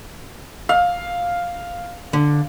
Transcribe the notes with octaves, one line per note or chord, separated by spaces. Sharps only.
F5
D3